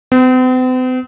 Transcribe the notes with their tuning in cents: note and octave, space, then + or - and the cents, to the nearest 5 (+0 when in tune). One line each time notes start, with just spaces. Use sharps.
C4 -45